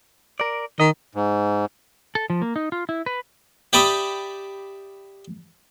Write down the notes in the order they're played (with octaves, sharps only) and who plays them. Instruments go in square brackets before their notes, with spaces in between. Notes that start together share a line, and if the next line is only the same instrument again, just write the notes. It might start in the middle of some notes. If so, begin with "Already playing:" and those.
[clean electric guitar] A#4 D5
[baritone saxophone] D#3 [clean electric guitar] D#5
[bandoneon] G#2
[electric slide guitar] A4
F3
A#3
D#4
F4
E4
B4
[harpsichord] G4 D5 E5 B5 D#6